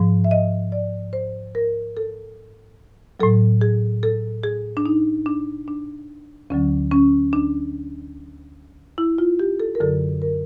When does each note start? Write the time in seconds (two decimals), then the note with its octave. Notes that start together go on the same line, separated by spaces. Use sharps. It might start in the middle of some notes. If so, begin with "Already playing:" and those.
Already playing: G#2 F3
0.24 E5
0.31 D#5
0.72 D5
1.13 C5
1.55 A#4
1.97 A4
3.20 A2 F#3 A4
3.61 G#4
4.03 A4
4.43 G#4
4.77 D4
4.86 D#4
5.26 D4
5.68 D4
6.50 D2 D3 F#3 C#4
6.92 C#4
7.33 D4
8.98 E4
9.18 F4
9.40 G4
9.60 A4
9.75 A#4
9.80 F#2 D3 F#3 A4
10.22 A#4